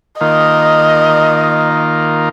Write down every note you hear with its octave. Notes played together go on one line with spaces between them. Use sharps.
D#3 A#3 F4 D#5